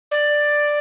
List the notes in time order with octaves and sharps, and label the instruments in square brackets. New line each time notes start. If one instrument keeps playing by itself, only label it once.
[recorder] D5